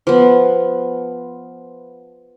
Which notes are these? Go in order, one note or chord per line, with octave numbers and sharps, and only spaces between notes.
F3 B3